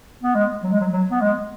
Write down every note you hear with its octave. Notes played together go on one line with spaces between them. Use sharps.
B3
G#3
F#3
G#3
F#3
F#3
B3
G#3